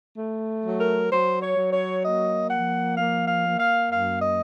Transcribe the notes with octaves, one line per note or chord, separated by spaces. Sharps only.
A3
F#3
A#4
F#3 C5
C#5
F#3
C#5
A#3 D#5
F3 F#5
A#3 F5
F5
A#3
F5
F#2 F5
D#5